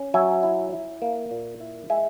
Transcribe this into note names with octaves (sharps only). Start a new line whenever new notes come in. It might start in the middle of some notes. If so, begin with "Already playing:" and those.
Already playing: C#4
F#3 E5 G#5
E4
E4
A#3
A#2
E4
G#3 E5 G#5